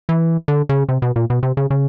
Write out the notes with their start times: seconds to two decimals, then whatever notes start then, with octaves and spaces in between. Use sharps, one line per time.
0.09 E3
0.48 D3
0.69 C#3
0.89 C3
1.02 B2
1.16 A#2
1.30 B2
1.43 C3
1.57 C#3
1.70 C#3